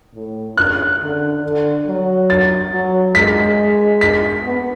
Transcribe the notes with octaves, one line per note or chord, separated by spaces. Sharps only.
A2
C#3 F#6
D3
D3
F#3
A6
F#3
G#3 B6
B6
B3